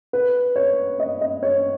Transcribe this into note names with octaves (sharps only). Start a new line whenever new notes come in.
B4
C#5
D#5
D#5
C#5